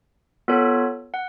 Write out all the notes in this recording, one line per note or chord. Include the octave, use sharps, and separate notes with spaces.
B3 F4 A4 C#5
F#5